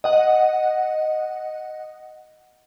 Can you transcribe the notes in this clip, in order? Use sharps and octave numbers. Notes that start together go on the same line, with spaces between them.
D#5 F#5